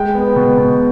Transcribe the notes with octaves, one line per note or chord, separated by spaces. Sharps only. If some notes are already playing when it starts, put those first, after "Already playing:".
Already playing: G#3 G5
B3
B2
B2